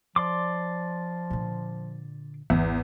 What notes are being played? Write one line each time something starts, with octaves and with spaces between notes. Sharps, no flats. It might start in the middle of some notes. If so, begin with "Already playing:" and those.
F3 D5 C6 D6
A#2 D3
G#1 E2